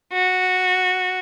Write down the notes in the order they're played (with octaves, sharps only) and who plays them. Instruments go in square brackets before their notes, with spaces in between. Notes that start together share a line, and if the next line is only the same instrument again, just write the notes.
[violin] F#4